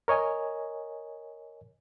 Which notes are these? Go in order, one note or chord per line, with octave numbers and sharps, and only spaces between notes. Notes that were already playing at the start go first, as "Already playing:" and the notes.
A#4 C#5 D#5 G#5